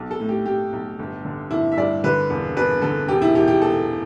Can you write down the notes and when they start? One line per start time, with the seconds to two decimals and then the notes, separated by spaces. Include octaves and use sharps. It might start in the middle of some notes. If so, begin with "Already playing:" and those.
Already playing: B1
0.11 A4
0.20 A2
0.29 G4
0.46 A2 G4
0.73 B1
0.99 G1
1.25 D3
1.51 G1 E4
1.72 E5
1.77 G2 D5
2.04 D3 B4
2.30 E1
2.56 E1 B4
2.82 D3 A4
3.08 E1 G4
3.22 E4
3.35 E1 G4
3.48 G4
3.61 E1 A4